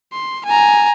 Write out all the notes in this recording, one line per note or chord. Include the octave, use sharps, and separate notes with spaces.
C6
G#5 A#5